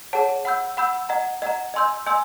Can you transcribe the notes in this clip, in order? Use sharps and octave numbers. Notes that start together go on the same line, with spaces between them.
G#4 C#5 F#5 A5
F#5 B5 E6 G6
F#5 B5 E6 G6
D#5 F#5 A#5
D#5 F#5 A#5
D#5 G#5 C6 E6 G6
D#5 G#5 C6 E6 G6